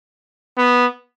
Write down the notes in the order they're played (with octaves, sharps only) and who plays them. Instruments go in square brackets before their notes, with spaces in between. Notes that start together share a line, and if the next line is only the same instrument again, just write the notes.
[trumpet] B3